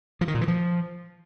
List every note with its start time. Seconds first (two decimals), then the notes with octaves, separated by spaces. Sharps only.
0.21 F3
0.28 D#3
0.34 A#2
0.41 E3
0.48 F3